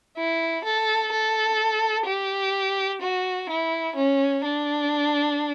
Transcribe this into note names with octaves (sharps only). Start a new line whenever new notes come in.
E4
A4
A4
G4
F#4
E4
C#4
D4